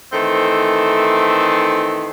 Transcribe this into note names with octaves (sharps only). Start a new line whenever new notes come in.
D#3 E3 A3 C4